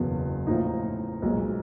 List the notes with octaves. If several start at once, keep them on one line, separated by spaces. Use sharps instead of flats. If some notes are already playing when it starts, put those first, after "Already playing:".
Already playing: F#1 E2 B2
A2 F3 A#3 D#4
B1 A#2 F3 G#3